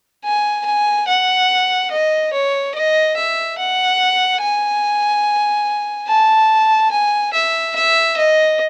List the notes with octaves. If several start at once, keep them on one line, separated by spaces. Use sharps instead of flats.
G#5
G#5
F#5
D#5
C#5
D#5
E5
F#5
G#5
A5
G#5
E5
E5
D#5